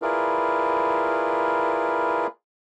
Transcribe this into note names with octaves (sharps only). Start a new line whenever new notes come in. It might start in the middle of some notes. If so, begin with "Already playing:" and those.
E4 F4 G#4 A#4 B4 D5